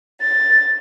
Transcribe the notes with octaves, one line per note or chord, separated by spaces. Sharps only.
A6